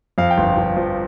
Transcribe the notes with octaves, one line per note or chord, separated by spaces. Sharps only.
F2 F5
G5
G1 F5
G1
F3